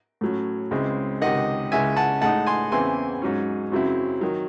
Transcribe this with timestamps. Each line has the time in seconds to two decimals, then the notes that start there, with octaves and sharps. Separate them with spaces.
0.21 A2 F#3 C#4
0.71 C#2 C#3 G#3 C4 E4
1.22 C#2 C3 D#3 D#5 F#5
1.71 C#2 C#3 G#3 C#4 E4 E5 G#5
1.96 F#5 A5
2.21 A2 G#3 D#4 F#5 A5
2.46 G#5 C6
2.72 E2 C#3 E3 C4 E4 G#5 C6
3.22 G#2 F#3 C#4
3.72 F#2 C#3 F#3 C4 E4
4.21 D#3 F#3